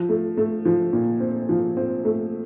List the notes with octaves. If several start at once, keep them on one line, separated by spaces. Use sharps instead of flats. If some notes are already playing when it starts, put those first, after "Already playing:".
Already playing: F3
A3
A3
F3
A#2
C4
F3
C4
A3